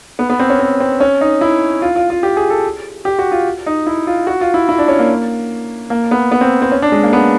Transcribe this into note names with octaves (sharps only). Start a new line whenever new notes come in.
B3
B3
C4
C#4
C4
C4
C#4
D#4
E4
F4
F4
F4
G4
G#4
A4
G4
F#4
F4
D#4
E4
F4
F#4
F4
E4
E4
D4
C#4
A#3
A#3
B3
B3
C4
C4
C#4
D4
G#3
A#3
B3